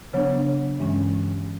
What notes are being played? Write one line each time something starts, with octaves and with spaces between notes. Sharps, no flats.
C#3 F#3 B3 D4 C#5
G2 E3 G#3 C#4